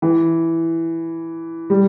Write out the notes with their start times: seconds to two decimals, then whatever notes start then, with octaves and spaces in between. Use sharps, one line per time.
0.02 E3
1.70 G3